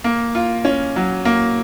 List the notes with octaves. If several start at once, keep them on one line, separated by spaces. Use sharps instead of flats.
A#3
F4
C#4
F#3
A#3